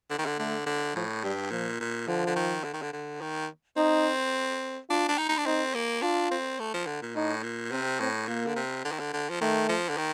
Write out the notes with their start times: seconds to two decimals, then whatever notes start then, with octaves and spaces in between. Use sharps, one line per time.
0.10 D3
0.18 D#3
0.26 D3
0.39 D3 A3
0.66 D3
0.95 A2 F3
1.24 G2 G3
1.51 A#2 F3
1.80 A#2
2.08 D3 F3
2.27 D3
2.36 D#3
2.64 D3
2.74 D#3
2.82 D3
2.93 D3
3.21 D#3
3.77 C4 D#4
4.90 D4 F4
5.09 D4
5.18 D#4
5.29 D#4
5.38 D4
5.46 C4 D#4
5.75 A#3
6.02 D4 F4
6.31 C4
6.60 A3
6.74 F3
6.87 D3
7.02 A#2
7.16 A2 D#4
7.43 A#2
7.72 C3 C4
8.00 A2 C4
8.28 A#2 A#3
8.47 D3
8.56 C3
8.85 D3
8.92 D#3
9.00 D3
9.13 D3
9.30 F3
9.41 D#3 A3
9.69 F3
9.89 D3
9.97 D#3